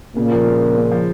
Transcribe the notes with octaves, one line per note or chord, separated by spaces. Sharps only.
A#2 C#3 A#3
F3
G#3
C#3
C#3
F3